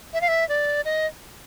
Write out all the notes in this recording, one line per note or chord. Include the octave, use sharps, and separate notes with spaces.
E5
F5
E5
D5
D#5